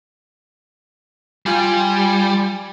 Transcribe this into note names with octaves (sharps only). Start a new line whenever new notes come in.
G3 F4 G5 G#5